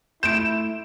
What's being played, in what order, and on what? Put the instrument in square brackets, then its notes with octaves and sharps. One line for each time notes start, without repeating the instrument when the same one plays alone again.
[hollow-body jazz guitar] A3 C6 [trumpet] E4 [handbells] G6 D7 [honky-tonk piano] E7